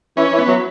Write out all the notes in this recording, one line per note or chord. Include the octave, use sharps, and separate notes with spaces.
E3 C#4
E3
B3
F#3